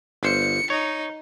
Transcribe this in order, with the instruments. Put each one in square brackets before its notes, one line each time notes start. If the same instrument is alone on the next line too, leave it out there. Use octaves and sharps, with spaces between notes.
[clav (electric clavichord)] G1 C5 [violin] C#7
[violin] D#4 [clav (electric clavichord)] C#5